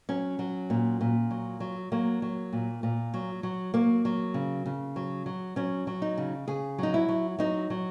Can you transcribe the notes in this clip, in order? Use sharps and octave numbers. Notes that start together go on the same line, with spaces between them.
F#3 C#4
F#3
A#2
A#2
F#3
F#3
F#3 A#3
F#3
A#2
A#2
F#3
F#3
F#3 A#3
F#3
C#3
C#3
F#3
F#3
F#3 C#4
F#3
D#4
C#3
C#3 G#4
F#3 D#4
E4
F#3
F#3 D#4
F#3